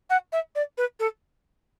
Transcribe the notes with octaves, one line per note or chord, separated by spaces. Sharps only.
F#5
E5
D5
B4
A4